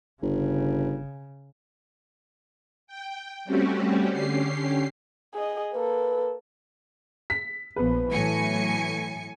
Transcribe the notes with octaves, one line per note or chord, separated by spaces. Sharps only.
G1 C#3
G5
G3 A3 C4 C#4 F#4 G4
D3 C#4 G4 C7
G#4 D#5
A#3 A4 B4
B6
A#1 F3 B3 B4
A2 E3 F#3 A3 G#5 C#7